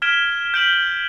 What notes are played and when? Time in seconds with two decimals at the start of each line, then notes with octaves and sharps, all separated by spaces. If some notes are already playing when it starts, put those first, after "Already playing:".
0.02 F6 G#6 B6 D7 E7 G7
0.54 G6 B6 D7 E7 F#7 G7